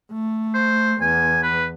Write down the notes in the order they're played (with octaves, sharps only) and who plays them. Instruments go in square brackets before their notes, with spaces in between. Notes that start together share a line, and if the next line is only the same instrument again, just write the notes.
[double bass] A3
[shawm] C5
[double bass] E2 [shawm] G#5
[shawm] B4